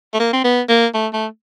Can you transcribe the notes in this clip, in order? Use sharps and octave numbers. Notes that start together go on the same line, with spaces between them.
A3
A#3
C4
B3
A#3
A3
A3